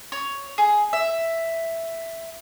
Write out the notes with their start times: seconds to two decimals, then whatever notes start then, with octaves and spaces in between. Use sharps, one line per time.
0.12 C#5
0.58 G#4
0.93 E5